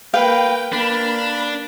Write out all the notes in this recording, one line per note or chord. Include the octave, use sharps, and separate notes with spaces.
A#3 B4 F5 G5
A#3 D4 B5